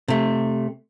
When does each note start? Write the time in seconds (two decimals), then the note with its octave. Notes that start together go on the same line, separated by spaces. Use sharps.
0.08 C3 A3